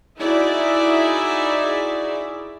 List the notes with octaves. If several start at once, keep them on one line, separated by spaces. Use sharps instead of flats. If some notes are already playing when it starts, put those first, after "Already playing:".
D#4 E4 F#4 G#4 D5 E5